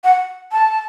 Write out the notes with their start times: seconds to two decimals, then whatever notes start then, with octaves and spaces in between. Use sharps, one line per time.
0.04 F#5
0.52 A5